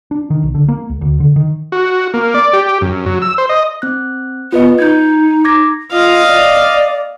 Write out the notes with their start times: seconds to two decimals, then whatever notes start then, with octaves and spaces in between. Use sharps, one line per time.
0.11 D4
0.30 D#3
0.43 B1
0.55 D3
0.68 A#3
0.90 C#2
1.01 D2
1.20 D3
1.36 D#3
1.72 F#4
2.14 A#3
2.35 D5
2.53 G4
2.81 F#2
3.06 F#3
3.22 E6
3.38 C5
3.49 D#5
3.82 C4 F#6
4.52 B3 F4 B4 D#5
4.79 D#4 G6 G#6
5.45 D6 G#6 A#6
5.92 F4 D#5 F5
6.27 D5